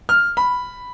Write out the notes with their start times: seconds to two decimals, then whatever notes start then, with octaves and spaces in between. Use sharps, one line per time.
0.09 F6
0.37 B5